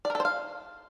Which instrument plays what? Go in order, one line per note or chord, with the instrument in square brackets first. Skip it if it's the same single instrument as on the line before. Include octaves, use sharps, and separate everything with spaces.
[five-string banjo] D5
A#4
A4
C5
F5